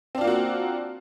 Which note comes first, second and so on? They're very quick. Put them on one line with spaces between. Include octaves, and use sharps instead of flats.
C4 D4 F4 A#3 F#4